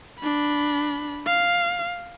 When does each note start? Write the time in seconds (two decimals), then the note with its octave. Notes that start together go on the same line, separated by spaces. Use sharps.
0.20 D4 B5
1.26 F5